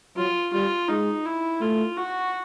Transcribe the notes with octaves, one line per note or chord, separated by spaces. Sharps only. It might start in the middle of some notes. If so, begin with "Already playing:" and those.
F#3 F4
G3 F4
G#3 D#4
E4
A3 F4
F#4